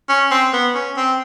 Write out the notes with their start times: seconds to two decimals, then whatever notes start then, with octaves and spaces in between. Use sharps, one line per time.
0.09 C#4
0.31 C4
0.53 B3
0.74 C#4
0.97 C4